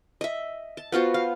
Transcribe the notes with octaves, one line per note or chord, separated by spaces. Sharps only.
D#5 E5
A5
B3 F4 F#4 C5
F5